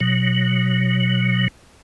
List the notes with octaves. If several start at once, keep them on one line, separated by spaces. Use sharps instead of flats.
B2 F#3